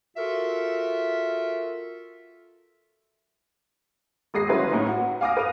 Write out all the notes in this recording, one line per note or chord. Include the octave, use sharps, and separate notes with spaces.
F4 F#4 A4 A#4 E5
G#1 G#3 D#6 A#6 C7
G1 F#3 C#4 E4 B4 C6
A2 C#4 D#4
F#4
F5 G#5 D6 D#6 F6 A#6
B4 D#6 D#7 F7